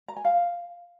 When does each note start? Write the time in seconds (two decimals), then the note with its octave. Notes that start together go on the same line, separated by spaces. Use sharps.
0.08 A#5
0.16 G#5
0.25 F5